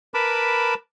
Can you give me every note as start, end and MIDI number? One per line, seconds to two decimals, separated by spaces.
0.14 0.74 70
0.14 0.74 71
0.14 0.74 81
0.14 0.74 83
0.14 0.74 86